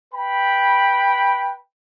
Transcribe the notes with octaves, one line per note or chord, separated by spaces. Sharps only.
B4 G5 B5